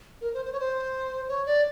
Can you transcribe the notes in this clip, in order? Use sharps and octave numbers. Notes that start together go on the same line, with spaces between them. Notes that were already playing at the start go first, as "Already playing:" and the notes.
A#4
C5
C5
C#5
C5
C#5
D5